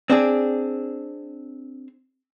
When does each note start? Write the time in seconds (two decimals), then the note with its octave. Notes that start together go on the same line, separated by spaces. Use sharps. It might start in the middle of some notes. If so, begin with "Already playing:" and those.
0.10 C4 D4 G#4